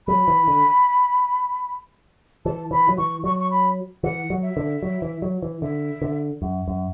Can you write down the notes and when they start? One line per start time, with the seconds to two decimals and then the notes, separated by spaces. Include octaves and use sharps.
0.07 F#3 B5
0.28 E3
0.48 D3
2.45 E3 A5
2.71 E3 B5
2.88 F#3
2.98 E3 C#6
3.24 F#3 C#6
3.40 C#6
3.51 B5
4.04 E3 F#5
4.30 F#3
4.43 E5
4.57 D3
4.83 F#3
5.02 E3
5.22 F#3
5.42 E3
5.62 D3 E5
6.02 D3
6.42 F#2
6.68 F#2